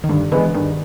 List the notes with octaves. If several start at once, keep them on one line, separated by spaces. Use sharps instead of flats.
D#3
G2 D3
D3 E3 G#3 B3
G2 D#3